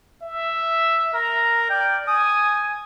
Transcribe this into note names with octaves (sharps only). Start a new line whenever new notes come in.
E5
A#4 A#5
D5 G5
G#5 D#6